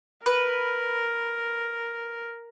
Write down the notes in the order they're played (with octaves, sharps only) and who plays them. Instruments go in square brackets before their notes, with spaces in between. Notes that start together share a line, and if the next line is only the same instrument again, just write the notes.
[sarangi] A#4 [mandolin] B4